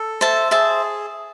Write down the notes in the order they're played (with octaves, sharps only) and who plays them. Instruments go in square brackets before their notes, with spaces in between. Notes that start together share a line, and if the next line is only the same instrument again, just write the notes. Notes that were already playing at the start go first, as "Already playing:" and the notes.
Already playing: [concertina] A4
[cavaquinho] C5 E5 A5
[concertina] G#4 [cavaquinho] C5 E5 A5